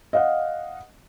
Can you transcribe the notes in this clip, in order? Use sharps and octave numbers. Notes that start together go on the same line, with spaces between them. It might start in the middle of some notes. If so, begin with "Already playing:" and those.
D#5 F5 F#5